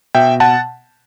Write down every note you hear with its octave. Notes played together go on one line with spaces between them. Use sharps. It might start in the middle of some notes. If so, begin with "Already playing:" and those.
B2 E5 G5
F#5 A5